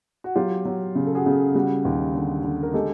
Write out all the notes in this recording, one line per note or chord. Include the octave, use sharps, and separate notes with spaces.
F#4
F#3 F4 G4
F#3
C#3
A4
F#4 G#4
C#3
G3 F#4
D#2
D3
D3
A#4
G#3 G4 A4